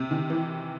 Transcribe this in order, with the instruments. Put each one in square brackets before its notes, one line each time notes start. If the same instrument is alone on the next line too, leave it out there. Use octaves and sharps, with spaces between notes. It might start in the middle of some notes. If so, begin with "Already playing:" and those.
Already playing: [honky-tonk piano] C3
D#3
E3